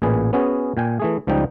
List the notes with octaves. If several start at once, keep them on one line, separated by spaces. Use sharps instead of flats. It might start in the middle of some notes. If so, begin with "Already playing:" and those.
A1 A#2 G#4 B4
B3 C#4 F#4 G#4
A#2 G5 G#5
E3 A3 G#4
C#2 F3 G3 D#4 G5